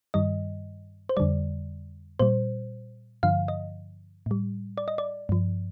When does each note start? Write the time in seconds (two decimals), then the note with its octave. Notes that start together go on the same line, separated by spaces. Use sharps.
0.14 G2 D#3 G3 D#5
1.09 C5
1.17 F2 D3 G3 D5
2.19 A#2 G3 C5
3.23 G2 D3 F3 F5
3.48 D#5
4.26 A2 G3
4.78 D5
4.88 D#5
4.98 D5
5.29 G2 F3